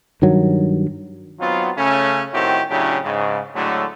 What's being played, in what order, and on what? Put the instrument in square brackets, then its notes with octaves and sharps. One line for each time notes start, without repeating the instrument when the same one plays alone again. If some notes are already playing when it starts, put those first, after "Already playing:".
[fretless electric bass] G2 D#3 F#3
[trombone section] F#3 B3 C4 D#4 F4
C#3 A3 C#4
A2 D#3 C4 E4 F#4 G4
A2 C#3 F#3 D4 E4 G4
G#2 C#3
A2 D3 F#3 G#3 A3